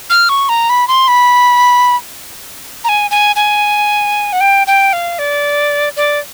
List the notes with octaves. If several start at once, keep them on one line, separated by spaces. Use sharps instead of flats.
F6
C#6
A#5
B5
C6
B5
A#5
G#5
G#5
G#5
F#5
G5
G5
F5
D5
D5